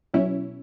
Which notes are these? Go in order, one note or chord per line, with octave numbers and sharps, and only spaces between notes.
B1 B2 F#3 C#4 E4